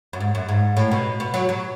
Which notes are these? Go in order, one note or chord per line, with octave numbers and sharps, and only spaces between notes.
F#2
G#2
F#2
G#2
A2
B2
B2
F#3
F#3